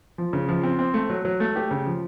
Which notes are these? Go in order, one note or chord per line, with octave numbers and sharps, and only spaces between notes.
F3
C#3
F3
C4
C4
A3
F#3
F#3
A3
G4
C#3
F3